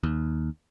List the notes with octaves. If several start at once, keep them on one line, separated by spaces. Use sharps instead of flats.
D#2